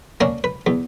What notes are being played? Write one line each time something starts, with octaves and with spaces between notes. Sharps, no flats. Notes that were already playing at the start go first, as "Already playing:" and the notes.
A#3 C#4 D4
B4
E2